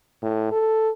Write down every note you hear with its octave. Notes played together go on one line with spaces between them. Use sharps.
A2
A4